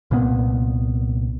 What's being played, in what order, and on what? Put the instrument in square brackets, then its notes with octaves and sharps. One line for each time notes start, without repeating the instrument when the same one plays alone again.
[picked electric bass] C2 A#2 B3